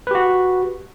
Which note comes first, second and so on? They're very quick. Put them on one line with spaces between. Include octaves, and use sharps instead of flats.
B4 G4 F#4